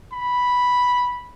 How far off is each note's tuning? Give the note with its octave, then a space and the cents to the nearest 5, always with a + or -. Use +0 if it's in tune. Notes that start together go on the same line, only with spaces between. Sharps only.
B5 -5